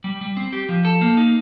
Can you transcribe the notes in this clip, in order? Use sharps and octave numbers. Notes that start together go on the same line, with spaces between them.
G3
G3
C4
G4
F3
A4
A#3
D#4